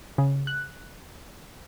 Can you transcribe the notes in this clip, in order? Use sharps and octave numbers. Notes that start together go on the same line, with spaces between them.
C#3
F#6